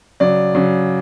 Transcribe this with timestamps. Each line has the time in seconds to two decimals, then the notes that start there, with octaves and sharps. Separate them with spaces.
0.20 C#3 F#3 D5
0.55 C#3 F#3